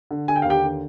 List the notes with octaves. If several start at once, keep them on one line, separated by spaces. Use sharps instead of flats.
D3
D3 G#5
G5
F5
D#2
G4 G5
D3